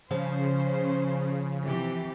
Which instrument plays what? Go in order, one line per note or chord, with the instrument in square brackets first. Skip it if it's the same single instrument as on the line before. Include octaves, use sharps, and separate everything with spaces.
[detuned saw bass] C#3 [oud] F3 [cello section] C#4 C5
[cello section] C3 E3 G4